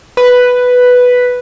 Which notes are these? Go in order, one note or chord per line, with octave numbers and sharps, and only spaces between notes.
B4